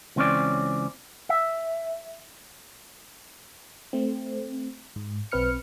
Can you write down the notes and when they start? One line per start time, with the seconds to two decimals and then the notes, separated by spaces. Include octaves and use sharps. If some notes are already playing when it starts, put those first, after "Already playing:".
0.16 C#2 E3 C4 C#4 C#5 D5
1.29 E5
3.93 A3 C4
4.96 G#2
5.32 B1 C4 B4 F6 C#7